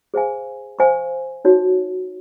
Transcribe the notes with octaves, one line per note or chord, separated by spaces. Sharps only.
G#4 C5 F5 G#5
C5 F5 G#5 C#6
D#4 F#4 C#5